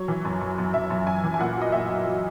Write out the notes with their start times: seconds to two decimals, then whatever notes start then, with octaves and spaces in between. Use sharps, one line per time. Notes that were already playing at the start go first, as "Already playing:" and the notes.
Already playing: F#3 C#5
0.08 E3
0.25 F#2
0.41 F#2
0.58 F#2
0.74 F#2 E5
0.90 F#2
1.07 F#2 G#5
1.24 E3
1.34 G#5
1.39 A#2 F#5
1.57 F#3 D#5
1.72 A#2 E5
1.89 F#3
2.06 F#3